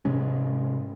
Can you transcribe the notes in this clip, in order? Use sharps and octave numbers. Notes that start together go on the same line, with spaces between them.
G#2 C3 G#3 C#4